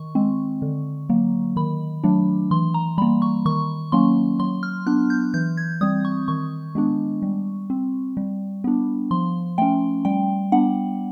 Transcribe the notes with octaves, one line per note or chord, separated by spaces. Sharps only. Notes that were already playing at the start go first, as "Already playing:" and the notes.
Already playing: D#3 C#6
G#3 C4
D3
F#3 A#3
D#3 B5
F#3 A3 D4
E3 C6
A#5
G3 A#3 B5
C#6
D#3 C#6
F#3 A#3 C#4 C6
F#3 C6
F6
B3 D4 F#6
G6
E3 G6
G#6
G3 C4 D#6
C#6
D#3 C#6
G#3 B3 D4
G3
C4
G3
B3 D4
F3 C6
A3 C#4 G5
G3 G5
B3 D4 F#5